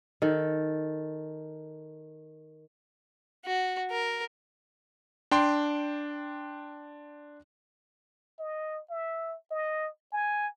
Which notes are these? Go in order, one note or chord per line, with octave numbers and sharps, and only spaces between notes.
D#3 A4
F#4
A#4
D4 G5 C6
D#5
E5
D#5
G#5